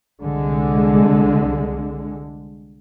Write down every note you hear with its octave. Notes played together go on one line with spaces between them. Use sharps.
C2 D3 G#3